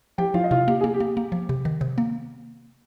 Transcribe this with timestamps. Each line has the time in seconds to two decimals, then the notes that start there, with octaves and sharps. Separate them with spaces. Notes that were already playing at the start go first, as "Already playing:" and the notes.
0.18 F3 G4 G5
0.34 F3 F4 F5
0.44 D#5
0.51 C3 F4 F5
0.67 A#3 G4
0.81 A#3 G#4
0.94 G4
1.00 A#3
1.17 A#3
1.32 F3
1.49 C3
1.65 D#3
1.81 C3
1.98 A#3